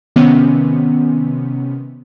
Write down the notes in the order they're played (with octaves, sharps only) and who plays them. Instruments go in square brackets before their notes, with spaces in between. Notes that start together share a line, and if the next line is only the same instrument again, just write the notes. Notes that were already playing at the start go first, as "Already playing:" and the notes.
[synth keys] C3 D#3 B3 C#4